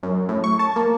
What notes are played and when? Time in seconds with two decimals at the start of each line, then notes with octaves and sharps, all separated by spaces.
0.03 F#2
0.29 A2
0.44 C#6
0.59 A5
0.76 A#3